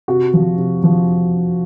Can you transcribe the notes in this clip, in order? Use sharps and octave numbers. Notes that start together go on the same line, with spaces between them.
C3 F#4
F3
C3
F3